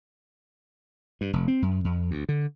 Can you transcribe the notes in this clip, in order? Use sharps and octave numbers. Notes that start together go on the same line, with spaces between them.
G2
F1
C4
F#2
F2
D2
D3